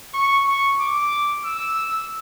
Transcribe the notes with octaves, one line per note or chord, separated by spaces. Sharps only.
C#6
C#6
D6
E6